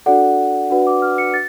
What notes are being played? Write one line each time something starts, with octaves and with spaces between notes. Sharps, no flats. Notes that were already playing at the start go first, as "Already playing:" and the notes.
D4 F#4 A4 D5 F#5
D4 F#4 B4 D5 F#5
D6
F6
C#7
A6